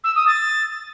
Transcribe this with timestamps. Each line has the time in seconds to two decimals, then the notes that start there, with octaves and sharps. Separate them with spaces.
0.04 E6
0.15 D#6
0.27 A6